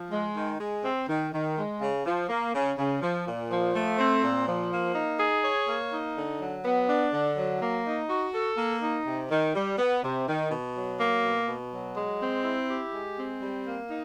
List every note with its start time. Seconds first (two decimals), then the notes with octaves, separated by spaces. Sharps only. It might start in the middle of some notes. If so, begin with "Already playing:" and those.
Already playing: F3
0.11 G#3
0.35 D#3
0.61 G#3
0.84 C4
1.08 D#3
1.33 D#3
1.57 G#3
1.81 C#3
2.06 F3
2.29 A#3
2.54 C#3
2.77 C#3
3.02 F3
3.27 A#2
3.50 F3
3.75 A3
3.98 C4
4.23 A#2
4.47 F3
4.72 A#3
4.95 D#4
5.20 G#4
5.44 C#5
5.67 A#3
5.92 D#4
6.16 D3
6.41 F#3
6.64 B3
6.88 D4
7.13 D3
7.37 F#3
7.61 A#3
7.86 D#4
8.10 F#4
8.33 A4
8.57 A#3
8.82 D#4
9.06 C3
9.31 D#3
9.55 G3
9.78 B3
10.03 C3
10.27 D#3
10.51 B2
10.75 F#3
11.00 A#3
11.23 B2
11.47 B2
11.72 F#3
11.96 G#3
12.20 C4
12.44 E4
12.69 G4
12.92 G#3
13.18 C4
13.42 G3
13.65 A#3
13.89 D#4